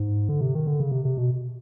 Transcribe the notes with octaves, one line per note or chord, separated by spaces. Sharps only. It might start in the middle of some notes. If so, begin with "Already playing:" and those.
Already playing: G#2
D3
C3
D#3
D3
C#3
C3
C3
B2